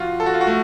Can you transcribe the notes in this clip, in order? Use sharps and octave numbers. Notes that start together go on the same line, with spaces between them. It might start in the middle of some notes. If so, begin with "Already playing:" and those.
Already playing: F3 F4 F#4
A4
F#4
F4
F#4
A3